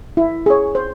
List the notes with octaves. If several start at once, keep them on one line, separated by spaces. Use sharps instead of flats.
E4
G#4 C#5
C5